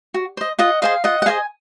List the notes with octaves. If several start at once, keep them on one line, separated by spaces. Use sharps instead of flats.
F#4
C5 D#5
F4 D#5 F#5
G#4 C5 D#5 F5
F4 D#5 F#5
F#5
G#4 C5 D#5 F5 G#5